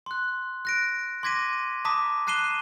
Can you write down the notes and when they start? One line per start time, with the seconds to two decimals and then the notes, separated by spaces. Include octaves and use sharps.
0.06 C6 F#6
0.65 F#6 A#6 D7
1.23 C6 D6 G#6 A#6 B6 D#7
1.85 A5 A#5 D6 D#6 B6
2.27 A5 F#6 C7 D#7 E7 G7